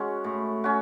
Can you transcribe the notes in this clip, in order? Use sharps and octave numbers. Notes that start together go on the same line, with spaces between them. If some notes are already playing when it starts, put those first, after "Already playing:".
Already playing: G#3 C#4 F#4
A2
C#4 F#4